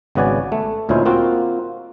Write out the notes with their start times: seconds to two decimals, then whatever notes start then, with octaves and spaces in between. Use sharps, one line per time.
0.15 G#1 C#3 B3 F#4 D5 G#5
0.52 A3
0.89 D2 A#2 C#4 D#4 E4 C5
1.05 A#3 C4 F4 F#4